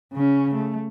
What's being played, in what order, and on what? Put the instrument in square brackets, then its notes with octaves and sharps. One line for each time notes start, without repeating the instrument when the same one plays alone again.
[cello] C#3 C#4
A3